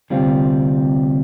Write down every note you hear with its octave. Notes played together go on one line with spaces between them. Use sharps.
D2 C3 G3 C4 F4